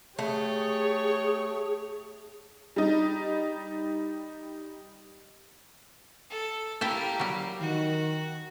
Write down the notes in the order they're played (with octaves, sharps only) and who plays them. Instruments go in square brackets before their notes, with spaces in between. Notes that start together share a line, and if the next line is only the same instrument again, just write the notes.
[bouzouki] A3 [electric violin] G4 C#5 [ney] G#4
[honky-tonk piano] G3 D#4
[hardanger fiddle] A4
[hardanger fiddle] A#3 G4 [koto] E4 G5 A5
[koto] F#3 G3
[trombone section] D#3 [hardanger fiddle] F#4